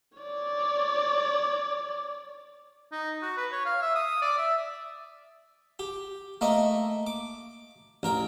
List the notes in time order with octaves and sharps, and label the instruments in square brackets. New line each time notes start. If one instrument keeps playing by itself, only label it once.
[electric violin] C#5 D5
[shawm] D#4
F#4
B4
C#5
F5
E5
D#6
D5
E5
[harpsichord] G4
A3 A#3 D#5
D6
A1 A#4 G5